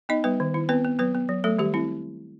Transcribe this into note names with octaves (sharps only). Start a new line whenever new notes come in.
B3 D#4 D#5
G3 B3 B4
D#3
D#3 E4
B3 C4 B4
B3
F#3 B3 B4
B3
F#3
F#3 A3 A4
D#3 G3 G4
C4 E4